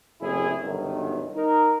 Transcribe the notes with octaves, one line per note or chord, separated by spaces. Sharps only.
F#1 A2 C3 E4 G#4
G1 F#2 B2 D#3
D#4 A#4